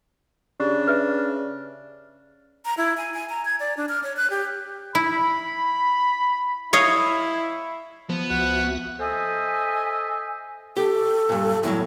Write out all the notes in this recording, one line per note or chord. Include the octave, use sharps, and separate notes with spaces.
C#3 D4 G4
B4 E5
A#5
E4
G#5
G#5
A#5
G#6
D5
D4
F6
C#5
F#6
G4
E4 B5
E4 C#5 D#5 F5
F3 B3
C#2 F#4 E5 F#5
A4 C5 D#5 E5 G#5
G4 A4
G2 A#2
E2 A2 F#3 E4